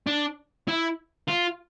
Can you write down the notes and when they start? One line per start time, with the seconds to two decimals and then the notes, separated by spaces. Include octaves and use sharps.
0.07 D4
0.68 E4
1.28 F4